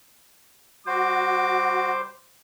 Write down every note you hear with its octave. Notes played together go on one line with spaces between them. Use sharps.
G3 F#4 C5 D6